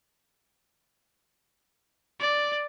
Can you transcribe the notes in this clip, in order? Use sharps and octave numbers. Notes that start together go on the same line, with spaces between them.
D5